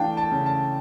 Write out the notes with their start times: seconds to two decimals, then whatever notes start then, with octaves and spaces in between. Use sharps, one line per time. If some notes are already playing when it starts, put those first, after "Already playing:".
Already playing: E3 A3 D4 F5 G5 A5
0.17 A5
0.31 C#3
0.46 A5